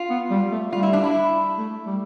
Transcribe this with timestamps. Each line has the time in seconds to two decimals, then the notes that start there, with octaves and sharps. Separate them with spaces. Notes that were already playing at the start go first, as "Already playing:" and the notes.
Already playing: F4
0.10 B3
0.31 G3
0.52 A3
0.73 G3 F4
0.83 E4
0.93 D4
1.04 E4
1.58 A3
1.87 G3